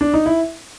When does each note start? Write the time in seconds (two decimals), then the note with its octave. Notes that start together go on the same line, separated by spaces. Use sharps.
0.01 D4
0.14 D#4
0.26 E4